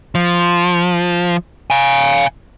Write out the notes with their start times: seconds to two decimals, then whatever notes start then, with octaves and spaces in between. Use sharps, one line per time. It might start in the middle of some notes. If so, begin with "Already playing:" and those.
0.15 F3
1.70 F5 G#5